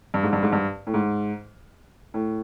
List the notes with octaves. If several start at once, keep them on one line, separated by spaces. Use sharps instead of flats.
G2
G#2
G2
G#2
G2
A2
G#2
A2